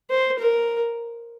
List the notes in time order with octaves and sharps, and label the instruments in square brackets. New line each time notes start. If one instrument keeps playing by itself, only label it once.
[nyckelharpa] C5
A#4